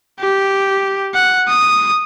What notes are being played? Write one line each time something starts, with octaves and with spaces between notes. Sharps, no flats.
G4
F#5
D#6